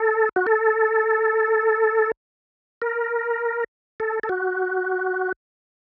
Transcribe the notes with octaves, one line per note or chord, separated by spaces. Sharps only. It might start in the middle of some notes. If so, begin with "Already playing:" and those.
Already playing: A4
F#4
A4
A#4
A4
A4
F#4